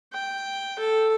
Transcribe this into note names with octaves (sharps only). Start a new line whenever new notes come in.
G5
A4